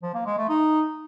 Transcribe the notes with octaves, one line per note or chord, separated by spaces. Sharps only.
F3
A#3
G#3
A3
D#4